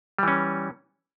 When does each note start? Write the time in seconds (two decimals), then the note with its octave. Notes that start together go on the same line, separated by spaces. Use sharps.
0.19 G3
0.23 E3
0.28 C#4